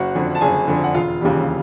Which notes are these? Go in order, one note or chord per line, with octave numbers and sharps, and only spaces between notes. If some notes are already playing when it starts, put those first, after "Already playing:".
Already playing: F#1 F#4 F#5
F2 D3
A5
F#1 G#4 G#5
F2 D3
F#5
E1 F4 F5
D#2 C#3 E3 G3